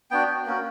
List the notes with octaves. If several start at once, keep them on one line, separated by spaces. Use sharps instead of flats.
B3 D4 F#4 G5
A#3 C#4 F#4